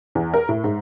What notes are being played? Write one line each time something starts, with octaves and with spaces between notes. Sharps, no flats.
E2
A#4
A2
G#2